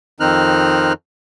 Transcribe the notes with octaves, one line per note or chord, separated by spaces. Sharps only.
F2 D#3 C4 D#4 F6 F#6